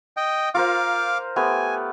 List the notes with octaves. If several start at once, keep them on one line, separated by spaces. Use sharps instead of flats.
D#5 G5
F4 A#4 C5 F5 D6
A3 B3 G4 G#5